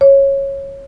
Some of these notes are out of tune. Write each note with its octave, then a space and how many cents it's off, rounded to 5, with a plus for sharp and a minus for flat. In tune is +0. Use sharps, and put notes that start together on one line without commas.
C#5 -15